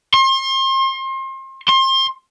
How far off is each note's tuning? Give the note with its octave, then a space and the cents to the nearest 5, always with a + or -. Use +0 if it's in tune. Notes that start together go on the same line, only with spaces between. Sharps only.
C6 +35
C6 +30